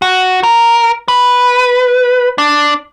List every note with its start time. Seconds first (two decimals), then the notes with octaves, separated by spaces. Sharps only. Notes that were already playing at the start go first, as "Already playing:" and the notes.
0.02 F#4
0.43 A#4
1.08 B4
2.38 D4